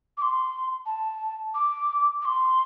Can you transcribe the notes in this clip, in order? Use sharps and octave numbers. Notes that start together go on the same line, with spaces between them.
D6
C6
A5
D6
D6
C6